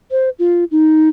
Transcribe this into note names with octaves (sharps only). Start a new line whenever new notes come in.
C5
F4
D#4